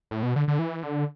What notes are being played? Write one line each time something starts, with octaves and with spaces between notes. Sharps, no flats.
A2
B2
D3
D3
E3
D3